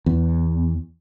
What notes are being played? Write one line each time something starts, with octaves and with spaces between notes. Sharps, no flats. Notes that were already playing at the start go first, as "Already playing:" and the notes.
E2